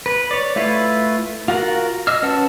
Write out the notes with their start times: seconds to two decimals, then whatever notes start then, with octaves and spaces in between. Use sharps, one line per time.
0.06 B4
0.31 C#5 D5
0.56 A3 E4 F4 B4
1.48 F4 F#4 A#4 F#5
2.07 D#5 E6 F6
2.22 C#4 B4 F#5 A5